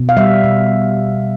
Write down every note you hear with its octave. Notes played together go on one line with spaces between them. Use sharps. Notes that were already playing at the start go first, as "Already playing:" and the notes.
Already playing: B2
F5
G3 E5
B2